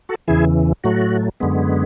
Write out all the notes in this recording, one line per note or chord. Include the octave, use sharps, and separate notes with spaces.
F#4 A4
E2 C#3 E3 E4 G#4
A2 F#3 A3 F#4
F#2 D3 G#3 B3